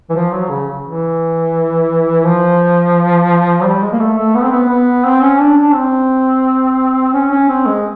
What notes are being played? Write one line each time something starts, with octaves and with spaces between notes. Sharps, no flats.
E3
F3
F#3
C#3
E3
F3
F#3
G3
G#3
A#3
A3
A3
B3
C4
B3
B3
C4
C#4
D4
D4
C4
C#4
C#4
C4
G#3